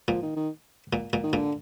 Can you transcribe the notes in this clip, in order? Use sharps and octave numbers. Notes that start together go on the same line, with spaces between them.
A#2 F3
D#3
D#3
A#2
A#2
D#3
A#2 D3